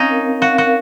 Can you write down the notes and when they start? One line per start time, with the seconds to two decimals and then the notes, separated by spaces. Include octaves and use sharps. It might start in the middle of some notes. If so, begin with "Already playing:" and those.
Already playing: C4 C#4 D#4 F5
0.10 A#4
0.26 C4
0.42 F#4 F5
0.58 F#4 A#4